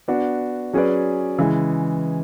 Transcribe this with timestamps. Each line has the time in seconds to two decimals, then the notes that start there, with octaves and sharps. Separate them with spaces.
0.08 B3 D4 F#4
0.73 F#3 C#4 G#4 B4 D5
1.38 C#3 E3 G#3